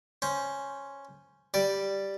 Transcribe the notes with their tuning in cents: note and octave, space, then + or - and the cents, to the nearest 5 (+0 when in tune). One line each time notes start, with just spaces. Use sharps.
C#4 +0 C5 +0
G3 +0 D5 +0